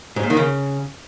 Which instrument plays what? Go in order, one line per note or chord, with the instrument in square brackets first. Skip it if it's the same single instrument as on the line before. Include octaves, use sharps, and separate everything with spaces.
[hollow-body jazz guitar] G#2
A#2
D#3
C#3